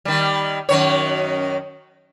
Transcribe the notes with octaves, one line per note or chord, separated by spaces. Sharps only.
D#3 G3
F#2 D#3 C#5